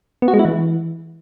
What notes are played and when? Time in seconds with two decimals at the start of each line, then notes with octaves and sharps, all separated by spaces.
0.22 B3
0.28 F#4
0.34 G#3
0.39 E4
0.45 E3